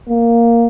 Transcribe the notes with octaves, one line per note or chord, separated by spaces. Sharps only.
A#3